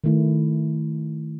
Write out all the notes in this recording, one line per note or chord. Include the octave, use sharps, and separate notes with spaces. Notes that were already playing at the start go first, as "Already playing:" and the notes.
D#3 A3 E4